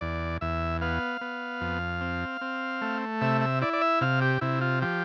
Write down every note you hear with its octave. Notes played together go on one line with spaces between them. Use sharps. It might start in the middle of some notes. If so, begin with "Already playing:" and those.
E2 D5
E2 E5
B3 F5
B3
F2
C4
C4
A3
C3 E5
E5
E4 D5
D5
E5
C3 F5
G4
C3 E4
F4
F3 G4